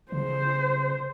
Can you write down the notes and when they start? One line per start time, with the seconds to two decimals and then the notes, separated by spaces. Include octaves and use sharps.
0.12 C#3 C5